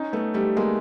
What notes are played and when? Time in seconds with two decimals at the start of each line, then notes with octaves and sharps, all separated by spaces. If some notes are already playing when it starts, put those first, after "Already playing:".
Already playing: C#4 D#4
0.13 A3 B3
0.34 G3 A3
0.57 G#3 A#3